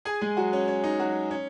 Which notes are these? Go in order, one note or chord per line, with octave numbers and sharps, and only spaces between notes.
G#4 G#5
G#3 G#4
F#3 F#4
C#4
C#4
D#4
F#3 F#4
C#4